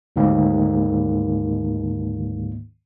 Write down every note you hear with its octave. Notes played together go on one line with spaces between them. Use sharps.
D2 G#2 D#3 A#3